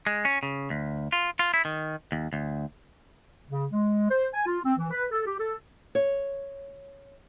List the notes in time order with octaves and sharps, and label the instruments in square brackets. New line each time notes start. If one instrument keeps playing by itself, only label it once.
[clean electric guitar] G#3
C#4
C#3
D2
F4
F4
E4
D#3
D#2
D2
[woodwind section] C#3
G#3
C5
G#5
F4
C4
E3
B4
A4
G4
A4
[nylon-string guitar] C#5